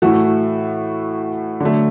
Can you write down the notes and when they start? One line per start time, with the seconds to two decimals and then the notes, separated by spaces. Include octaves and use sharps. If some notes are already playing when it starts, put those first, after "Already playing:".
0.02 A2 E3 A3 F#4
1.60 D3 F#3 A3